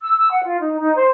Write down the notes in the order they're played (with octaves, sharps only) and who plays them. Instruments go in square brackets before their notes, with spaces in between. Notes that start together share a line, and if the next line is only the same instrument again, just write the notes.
[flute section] E6
E6
F#5
F4
D#4
D#4
C5